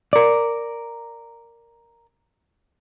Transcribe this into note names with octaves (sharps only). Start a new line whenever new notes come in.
A#4 D5